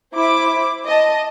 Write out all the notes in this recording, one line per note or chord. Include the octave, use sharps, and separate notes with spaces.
E4 C5 D6
D#5 A5